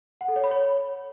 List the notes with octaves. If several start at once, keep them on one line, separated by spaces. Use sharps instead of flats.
F#5
A4
C#5
B5
C#5